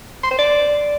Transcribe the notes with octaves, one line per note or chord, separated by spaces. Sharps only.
C6
C5
D5